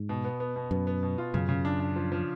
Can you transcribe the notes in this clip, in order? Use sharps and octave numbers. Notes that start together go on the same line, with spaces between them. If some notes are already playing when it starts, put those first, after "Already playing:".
Already playing: G#2
B2
B3
B3
B2
F#2 B3
B3
B2
F4
F#2 C#3
C#3
D4
D4
F3
F3